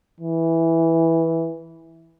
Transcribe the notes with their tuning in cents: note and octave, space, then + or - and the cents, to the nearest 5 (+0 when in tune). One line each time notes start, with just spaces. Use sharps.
E3 -5